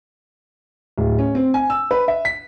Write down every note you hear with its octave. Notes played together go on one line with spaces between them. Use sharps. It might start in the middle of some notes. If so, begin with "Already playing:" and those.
D1
C#4
C4
G#5
E6
B4
E5
B6